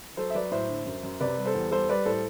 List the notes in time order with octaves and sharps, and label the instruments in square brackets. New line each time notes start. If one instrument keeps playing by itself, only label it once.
[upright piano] F#3 A4 C5
E5
F#3 B4 D5
A2 C5 E5
D3
F#2
F#2
C3 B4 D5
G3
A4 C5
E2
G3 A4 C5
G3 B4 D5
A2 A4 C5